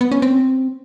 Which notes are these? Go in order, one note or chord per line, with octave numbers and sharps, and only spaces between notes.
B3
C#4
C4